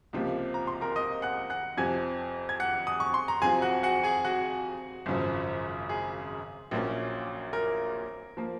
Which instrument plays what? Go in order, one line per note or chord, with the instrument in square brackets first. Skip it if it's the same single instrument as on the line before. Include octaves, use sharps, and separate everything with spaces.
[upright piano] C#2 C3 F3 A#3 F4
[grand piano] A#5
C6
A#4 A#5
D#5 D#6
F#5 F#6
F#5 F#6
[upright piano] F2 C3 F3 [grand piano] G#5 G#6
[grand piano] G#6
F#5 F#6
D#6
C#6
C6
A#5
[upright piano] F2 C3 F#3 C4 F4 [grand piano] G#4 G#5
[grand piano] F#4 F#5
F#4 F#5
G#4 G#5
F#4 F#5
[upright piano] G#1 F#2 C#3 F3
[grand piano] G#4
[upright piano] A#1 A#2 F#3 A#3 C#4
[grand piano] A#4
[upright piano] F3 A#3